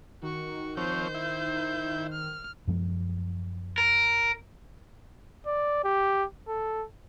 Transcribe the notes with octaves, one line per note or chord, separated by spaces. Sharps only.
D#3 F#4 C#6
F3 C4 C5 C#5 G6
E4
F6
F#2 F3 G#3
A#4
D5
G4
A4